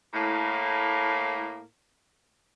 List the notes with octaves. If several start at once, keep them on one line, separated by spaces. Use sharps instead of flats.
A2 A#3